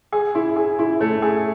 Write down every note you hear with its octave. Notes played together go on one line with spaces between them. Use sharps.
G#4
E4
G#4
E4
A3
G#4